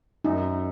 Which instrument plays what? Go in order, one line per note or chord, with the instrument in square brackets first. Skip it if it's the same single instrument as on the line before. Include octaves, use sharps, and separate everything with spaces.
[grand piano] F#2 [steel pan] D#4